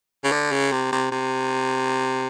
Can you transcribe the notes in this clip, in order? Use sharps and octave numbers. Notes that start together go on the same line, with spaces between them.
C#3
D3
C#3
C3
C3
C3